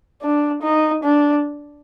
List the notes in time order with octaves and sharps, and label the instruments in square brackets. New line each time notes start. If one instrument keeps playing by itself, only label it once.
[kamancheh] D4
D#4
D4